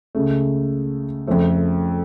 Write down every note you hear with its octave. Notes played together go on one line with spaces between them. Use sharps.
C#2 C#3 A3
F2 C#3 F3 A3